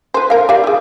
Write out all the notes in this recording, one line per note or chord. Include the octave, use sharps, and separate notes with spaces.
B4 C5
A#4 F5
G4 D5 F5
E4 G#4